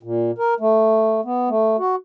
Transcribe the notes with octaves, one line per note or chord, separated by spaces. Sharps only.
A#2
A#4
A3
B3
A3
F#4